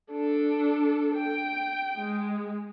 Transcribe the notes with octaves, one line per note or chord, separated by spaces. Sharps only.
D4 A4
G5
G#3